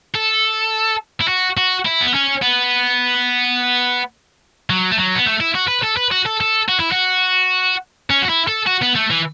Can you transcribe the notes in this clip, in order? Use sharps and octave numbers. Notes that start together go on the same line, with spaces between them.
A4
E4
F#4
F#4
E4
B3
C#4
B3
F#3
A3
F#3
B3
A3
E4
F#4
B4
A4
B4
F#4
A4
A4
F#4
E4
F#4
C#4
F#4
E4
A4
F#4
B3
A3
E3